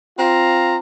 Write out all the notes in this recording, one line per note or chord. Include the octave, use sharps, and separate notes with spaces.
C4 F4 F5 A#5